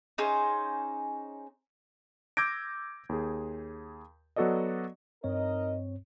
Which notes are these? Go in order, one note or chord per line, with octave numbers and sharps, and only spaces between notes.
C#4 D#4 G#4 C5
D6 E6 G6 G#6 A#6 D7
D#2 G#4
F#3 B3 F#4 A4 D5 D#5
G2 C4 D#4 A#4 C#5 D#5